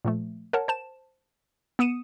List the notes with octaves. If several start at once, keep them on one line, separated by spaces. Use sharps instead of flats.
A#2 F3 A3
A#4 C#5 F#5 A5
C5 A5 E7
B3 D#6 C#7 D#7 E7